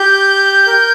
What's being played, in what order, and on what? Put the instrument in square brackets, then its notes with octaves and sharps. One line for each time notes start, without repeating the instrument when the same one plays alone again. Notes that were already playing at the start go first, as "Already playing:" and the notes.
Already playing: [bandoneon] G4 [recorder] G6
[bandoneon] A#4